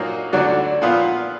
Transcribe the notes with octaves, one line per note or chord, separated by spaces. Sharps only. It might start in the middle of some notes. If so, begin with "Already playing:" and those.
Already playing: A#2 F#3 A#3 D#4
D2 D3 F#3 D4 F#4
A#2 F3 B3 F4